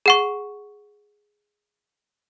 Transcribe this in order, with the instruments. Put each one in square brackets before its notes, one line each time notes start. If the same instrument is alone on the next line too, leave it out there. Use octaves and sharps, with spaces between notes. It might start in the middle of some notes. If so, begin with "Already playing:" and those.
[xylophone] G#4 F#5 C#6